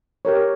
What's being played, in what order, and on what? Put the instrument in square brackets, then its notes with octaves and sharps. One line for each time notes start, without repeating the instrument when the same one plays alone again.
[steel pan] G4 A#4 C#5